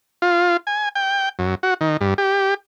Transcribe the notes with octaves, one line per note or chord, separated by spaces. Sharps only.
F4
G#5
G5
F#2
F#4
D#3
G2
G4